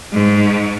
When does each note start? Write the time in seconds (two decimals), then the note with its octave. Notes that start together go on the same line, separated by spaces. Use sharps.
0.13 G#2